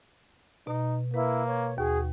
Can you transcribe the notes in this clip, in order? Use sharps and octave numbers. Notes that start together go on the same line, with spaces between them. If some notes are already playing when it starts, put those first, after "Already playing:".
B2 D#4
A#3 E4 B4
C#5
D#2 F#4 G#4